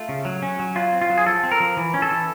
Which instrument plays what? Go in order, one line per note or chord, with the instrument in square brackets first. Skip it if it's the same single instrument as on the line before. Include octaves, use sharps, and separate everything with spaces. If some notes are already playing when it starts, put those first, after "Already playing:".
Already playing: [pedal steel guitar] A3 F4
C#3
F#3
C#4
F#3
F#3 F4
C4
F4
F#3
G#4
F3 A4
C4
A#4
F3
E3
C#4
A4
E3